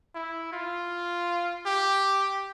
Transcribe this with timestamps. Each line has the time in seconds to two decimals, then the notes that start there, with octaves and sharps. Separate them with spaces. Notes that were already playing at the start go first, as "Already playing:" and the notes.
0.15 E4
0.53 F4
1.66 G4